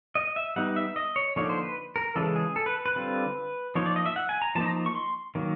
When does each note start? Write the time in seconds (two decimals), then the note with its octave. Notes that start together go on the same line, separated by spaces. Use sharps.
0.15 D#5
0.36 E5
0.56 G3 B3 D#4 F#5
0.76 E5
0.96 D#5
1.16 C#5
1.36 D3 F3 A#3 D#4 C#5
1.49 C5
1.63 B4
1.96 A#4
2.16 C#3 E3 G#3 A4
2.36 G#4
2.56 A4
2.66 B4
2.86 B4
2.96 D3 G3 C4 F4
3.75 F3 A#3 D#4 C#5
3.86 D5
3.96 D#5
4.06 E5
4.16 F#5
4.29 G#5
4.42 A#5
4.55 F3 A#3 D#4 A5
4.66 A#5
4.86 C#6
4.95 C6
5.35 D#3 F#3 A#3